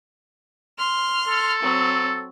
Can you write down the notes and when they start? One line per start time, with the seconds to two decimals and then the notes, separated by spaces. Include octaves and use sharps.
0.78 C6 F6
1.28 A4
1.62 F#3 C4